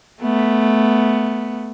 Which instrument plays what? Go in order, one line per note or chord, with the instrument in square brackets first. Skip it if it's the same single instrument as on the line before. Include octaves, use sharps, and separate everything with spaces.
[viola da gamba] A3 B3